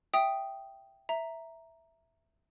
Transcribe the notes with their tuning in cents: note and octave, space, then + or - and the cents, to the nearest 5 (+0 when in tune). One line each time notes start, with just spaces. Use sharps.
E5 +0 G5 +0 D#6 +0
E5 +0 A#5 +0